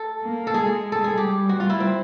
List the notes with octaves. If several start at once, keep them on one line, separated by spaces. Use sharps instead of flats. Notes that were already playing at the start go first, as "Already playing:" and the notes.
Already playing: A4
A#3
A4
G#3 G#4
A4
G#4
G3 G4
F#4
F4
E4
C4